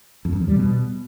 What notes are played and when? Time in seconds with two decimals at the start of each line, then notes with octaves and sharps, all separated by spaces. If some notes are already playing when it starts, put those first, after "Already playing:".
0.25 F2
0.33 F#2
0.40 E2
0.48 G3
0.56 B2